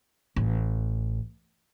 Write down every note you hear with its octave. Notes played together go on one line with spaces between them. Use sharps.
A1